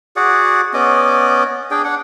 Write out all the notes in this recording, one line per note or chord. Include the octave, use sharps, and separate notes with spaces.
F#4 G#4 D5 F#5
B3 C#4 D5 D#5
D4 G#4 G5
D4 F#5